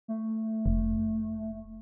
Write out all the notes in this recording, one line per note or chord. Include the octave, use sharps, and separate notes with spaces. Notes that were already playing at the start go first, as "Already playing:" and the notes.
A3
F1